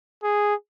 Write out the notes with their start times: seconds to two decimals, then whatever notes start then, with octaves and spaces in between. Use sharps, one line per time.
0.23 G#4